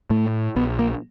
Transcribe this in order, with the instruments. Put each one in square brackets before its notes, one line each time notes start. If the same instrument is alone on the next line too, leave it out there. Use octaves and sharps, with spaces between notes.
[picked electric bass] A2 A3
A#1 B3
A#3